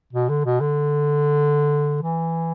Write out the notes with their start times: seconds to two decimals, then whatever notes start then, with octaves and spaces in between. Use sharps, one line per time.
0.13 B2
0.29 D3
0.45 B2
0.60 D3
2.02 E3